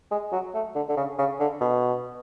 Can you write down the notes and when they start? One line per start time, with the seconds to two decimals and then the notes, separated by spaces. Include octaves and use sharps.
0.11 G#3
0.33 F#3
0.54 A3
0.75 D3
0.89 D3
0.97 C#3
1.18 C#3
1.40 D3
1.61 B2